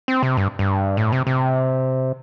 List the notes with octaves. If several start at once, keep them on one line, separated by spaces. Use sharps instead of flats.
C4
C3
G2
G2
A2
C3
C3